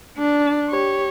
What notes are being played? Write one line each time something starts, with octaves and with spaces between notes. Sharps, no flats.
D4
G4 C#5